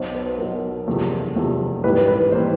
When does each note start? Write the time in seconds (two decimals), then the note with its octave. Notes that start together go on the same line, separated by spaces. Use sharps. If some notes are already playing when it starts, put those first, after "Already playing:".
Already playing: B1 B2 F#3 C5
0.14 B4
0.38 B1 B2 F#3 A#4
0.88 F#1 E2 C3 F3 A3
1.35 F#1 E2 C3 F3 A3
1.84 A1 G#2 E3 G3 A#3 B4
2.08 B4
2.32 E3 G3 A#3 C5